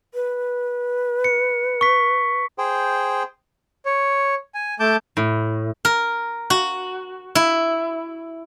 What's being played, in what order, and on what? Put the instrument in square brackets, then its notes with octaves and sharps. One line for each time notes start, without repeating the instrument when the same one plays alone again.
[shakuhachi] B4
[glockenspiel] C#7
C#6 B6
[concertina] G#4 C5 G5
[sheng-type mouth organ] C#5
G#5
A3 A5 D6 G6
[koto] A2
[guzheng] A#4
F#4
E4